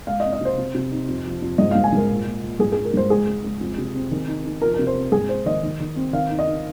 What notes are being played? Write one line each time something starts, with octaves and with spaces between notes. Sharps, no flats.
G#3 F5
D#5
C4
D#5
C3 C5
C3
C3
D#4
F2
F3
F2
G#2 D#5
G#2 F5
G#5
G#2 A#4
A#2
A#2
A#2
G#2 G#4
G#3 G#4
A#4
G#2 C5
G#3 G#4
G#3
G#3
F2
C3
C4
D#3
D#4
D#4
F3 A#4
C3 A#4
C5
C4
G#2 G#4
C4 C5
D#3 D#5
D#3
D#3
C4
D#3 F5
D#4
D#5
D#4